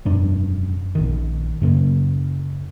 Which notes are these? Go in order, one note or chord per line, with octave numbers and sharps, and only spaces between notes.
E1 F#2 D4
A#1 D#3
F#2 C#3 A#3